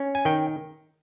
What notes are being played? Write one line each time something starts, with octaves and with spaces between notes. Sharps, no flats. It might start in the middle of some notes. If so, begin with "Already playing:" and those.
Already playing: C#4
G#5
D#3 G5